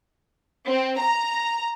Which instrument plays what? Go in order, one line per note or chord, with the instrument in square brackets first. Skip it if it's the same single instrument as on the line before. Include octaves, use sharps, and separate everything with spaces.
[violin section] C4
A#5